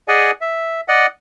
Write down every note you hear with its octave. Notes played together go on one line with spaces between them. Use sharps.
G#4 D5 D#5 F#5 G#5
E5
D5 D#5 F#5